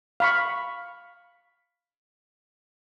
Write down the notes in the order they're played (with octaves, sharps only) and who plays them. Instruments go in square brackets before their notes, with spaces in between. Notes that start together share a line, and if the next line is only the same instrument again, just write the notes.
[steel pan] F5 B5 C#6